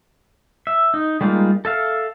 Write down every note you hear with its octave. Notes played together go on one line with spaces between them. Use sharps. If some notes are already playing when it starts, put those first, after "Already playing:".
E5
D#4
G3 G#3 A#3 D#4 F4
A4 E5 F5